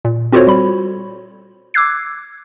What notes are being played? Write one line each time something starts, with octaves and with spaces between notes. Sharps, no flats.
A#2
C4 F4 F#4 A4 C5 C#5
G3 B5
D6 E6 F#6 G#6 C7